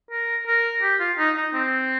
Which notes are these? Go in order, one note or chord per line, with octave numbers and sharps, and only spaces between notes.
A#4
A#4
G4
F4
D#4
D#4
C4